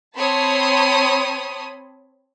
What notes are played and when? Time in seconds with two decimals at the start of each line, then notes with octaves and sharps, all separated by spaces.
0.17 C4 C#5 A5 B5 C6 D#6